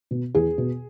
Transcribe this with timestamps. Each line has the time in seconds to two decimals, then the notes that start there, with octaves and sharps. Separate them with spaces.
0.11 B2
0.35 E2 G#4
0.58 B2